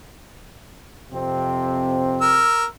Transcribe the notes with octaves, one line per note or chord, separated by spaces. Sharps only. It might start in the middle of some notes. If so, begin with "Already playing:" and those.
F2 C3 C4
A#4 E6